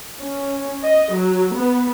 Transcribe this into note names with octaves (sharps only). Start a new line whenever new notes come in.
C#4
D#5
F#3
B3